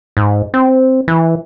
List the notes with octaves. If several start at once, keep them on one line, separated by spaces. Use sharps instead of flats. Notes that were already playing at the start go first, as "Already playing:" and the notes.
G#2
C4
E3